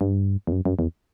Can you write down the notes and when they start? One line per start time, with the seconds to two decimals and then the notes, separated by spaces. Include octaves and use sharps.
0.01 G2
0.47 E2
0.52 F#2
0.65 F#2
0.79 E2